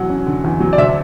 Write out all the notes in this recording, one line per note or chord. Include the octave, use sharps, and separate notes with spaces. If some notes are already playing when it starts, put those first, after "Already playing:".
Already playing: E2 F#3 F#5
C#4
D3
E2
F#3
D5
D2 E5